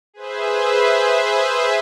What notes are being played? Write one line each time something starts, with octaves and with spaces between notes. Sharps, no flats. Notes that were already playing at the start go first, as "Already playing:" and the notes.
G#4 B4 C5 E5